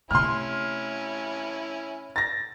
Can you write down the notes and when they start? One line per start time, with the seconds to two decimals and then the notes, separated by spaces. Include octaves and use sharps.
0.11 C3 A3 C#4 E4 C6 F6
2.16 A6 A#6